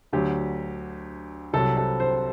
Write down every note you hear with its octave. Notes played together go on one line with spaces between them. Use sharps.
D2 D3 F#3 G4
C2 C3 F#3 A4
A4
C5